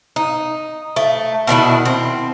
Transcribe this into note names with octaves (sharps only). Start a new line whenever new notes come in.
D#4
A3
B2 D#3 D4 E4
C4